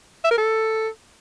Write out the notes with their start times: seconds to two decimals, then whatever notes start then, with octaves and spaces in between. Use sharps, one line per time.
0.25 E5
0.31 A#4
0.38 A4